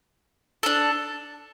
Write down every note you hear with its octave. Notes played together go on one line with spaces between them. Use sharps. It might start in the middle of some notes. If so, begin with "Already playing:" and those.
D4 A4